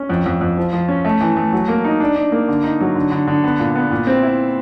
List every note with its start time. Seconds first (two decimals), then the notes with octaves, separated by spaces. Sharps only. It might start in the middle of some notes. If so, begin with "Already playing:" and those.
Already playing: C#4
0.09 F2
0.26 F2
0.41 F2
0.57 F3
0.73 F3
0.88 C#4
1.05 A3
1.21 E3
1.36 A3
1.53 F#3
1.68 A#3
1.85 D#4
2.00 D4
2.16 D4
2.32 A#3
2.48 D3
2.63 D#4
2.80 F#3
2.96 D3
3.12 D3
3.27 D3
3.44 B3
3.59 A#2
3.75 B3
3.91 A#2
4.07 C4
4.23 E4